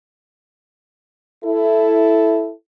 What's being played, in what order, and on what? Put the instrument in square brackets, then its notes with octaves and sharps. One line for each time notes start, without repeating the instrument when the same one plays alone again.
[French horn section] E4 A4